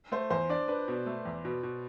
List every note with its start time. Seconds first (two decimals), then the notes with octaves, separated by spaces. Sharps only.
0.12 A3 C5
0.30 E2 C5
0.49 D4 D5
0.68 D4 B4
0.88 B2
1.06 A3
1.25 E2
1.45 B2
1.63 B2